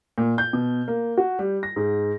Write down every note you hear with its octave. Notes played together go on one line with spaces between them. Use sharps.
A#2
G6
B2
A#3
F#4
G3
A#6
G#2